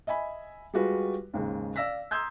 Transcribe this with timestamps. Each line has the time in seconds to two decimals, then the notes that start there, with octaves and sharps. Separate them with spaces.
0.07 D#5 E5 G#5 B5
0.73 G3 G#3 F4 F#4 B4
1.34 D#2 G#2 C#3
1.76 D5 F5 E6 A#6 B6
2.11 A#5 C6 D#6 E6 G6 G#6